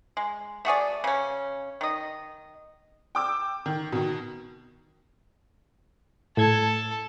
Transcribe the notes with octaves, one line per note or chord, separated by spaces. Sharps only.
G#3
A3 F#4 G#4 D5
C#3 C#4
D#3 D#5
G5 D6 E6
D#3
B2 D#3
A2 A4 G#6